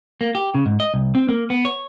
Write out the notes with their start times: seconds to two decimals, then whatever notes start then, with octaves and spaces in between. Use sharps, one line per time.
0.21 A#3
0.35 G4
0.55 C#3
0.66 G#2
0.80 D#5
0.94 C2
1.15 C4
1.29 A#3
1.50 B3
1.65 C#5